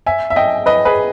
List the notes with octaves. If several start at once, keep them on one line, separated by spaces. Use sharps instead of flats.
E5 G#5
E5
D#5 G5
B4 D#5
G#4 B4